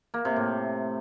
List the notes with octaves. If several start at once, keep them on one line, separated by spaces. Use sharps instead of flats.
A#3
C3
A2